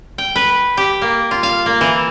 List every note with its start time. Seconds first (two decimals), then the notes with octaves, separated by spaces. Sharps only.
0.18 G5
0.36 B4
0.77 G4
1.02 A#3
1.31 F4
1.43 F5
1.66 A#3
1.81 E3